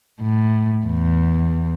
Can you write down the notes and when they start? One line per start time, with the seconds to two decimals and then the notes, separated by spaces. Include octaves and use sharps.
0.21 A2
0.86 E2